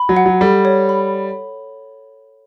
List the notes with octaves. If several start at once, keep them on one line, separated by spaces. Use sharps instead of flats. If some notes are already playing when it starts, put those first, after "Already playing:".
Already playing: B5
F#3
F#5
F#3
G3 A4
C#5
B5